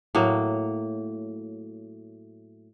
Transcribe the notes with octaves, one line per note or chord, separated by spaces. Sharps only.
A2 F#3 A#3